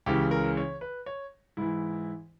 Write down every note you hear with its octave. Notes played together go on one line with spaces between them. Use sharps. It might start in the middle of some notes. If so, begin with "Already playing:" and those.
C#2 C#3 E3 G4
A#4
C#5
B4
C#5
G#2 E3 E4